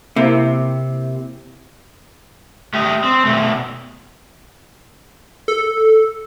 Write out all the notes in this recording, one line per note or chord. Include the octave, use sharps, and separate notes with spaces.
C3 A#3 C4 E4
A3 G4 D#5
C4
B2 A3
A4